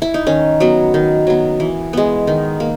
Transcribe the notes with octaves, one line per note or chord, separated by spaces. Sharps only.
E4
D#4
D#3 C#4
F#3 B3
D#3
F#3 B3
E3
G#3 B3
D#3
A#3